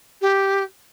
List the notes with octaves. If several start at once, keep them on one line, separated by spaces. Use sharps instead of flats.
G4